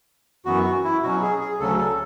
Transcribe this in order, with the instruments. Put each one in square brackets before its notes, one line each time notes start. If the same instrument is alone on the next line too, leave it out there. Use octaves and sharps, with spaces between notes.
[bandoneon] F#2 E3 B3 F#4
F#4
E4
B2 F#3 C#4 F#4
G#4
G#4
D2 C#3 F#3 C#4 A4
A4